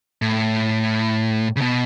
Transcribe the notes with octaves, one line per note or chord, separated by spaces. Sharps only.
A2
C#3
B2